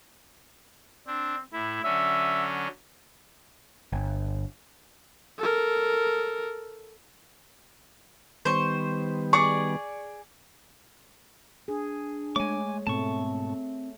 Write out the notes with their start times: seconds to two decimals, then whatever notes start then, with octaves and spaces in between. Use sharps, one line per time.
1.07 C4 D4
1.53 A2 E4
1.84 D3 F#3 C#4 E5
3.92 G1
5.38 A4 A#4
8.45 D#3 G3 B3 C5 C#6
9.33 G#4 D5 C#6
11.68 D4 G#4
12.36 G#3 A3 C#5 G#5 D6
12.87 G#2 B2 A3 C4 A5 C#6